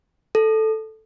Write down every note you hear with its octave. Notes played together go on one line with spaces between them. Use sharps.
A4